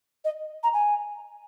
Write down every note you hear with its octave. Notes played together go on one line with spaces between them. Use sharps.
D#5
A#5
G#5